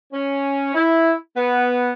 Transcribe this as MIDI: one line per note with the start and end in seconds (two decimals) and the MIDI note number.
0.12 0.72 61
0.75 1.12 64
1.36 1.91 59